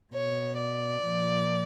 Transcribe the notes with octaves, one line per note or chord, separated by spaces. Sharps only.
B2 C#5
D5
A#2 F3